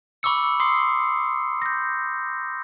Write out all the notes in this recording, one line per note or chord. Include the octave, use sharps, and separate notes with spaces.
B5 C#6 D6 E6 C#7
C6 D#6 C7
G6 A#6